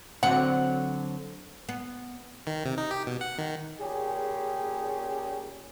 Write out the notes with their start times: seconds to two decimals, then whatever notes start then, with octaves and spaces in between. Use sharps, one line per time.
0.23 D3 F#3 C4 F#5
1.69 B3
2.47 D#3
2.65 C3
2.78 D#4
2.91 G4
3.07 B2
3.21 F#5
3.38 D#3
3.79 A#2 C#3 C#4 G4 G#4